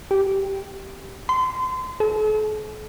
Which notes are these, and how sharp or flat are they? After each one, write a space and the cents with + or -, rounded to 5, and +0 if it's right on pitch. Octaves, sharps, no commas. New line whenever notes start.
G4 -10
C6 -35
A4 -45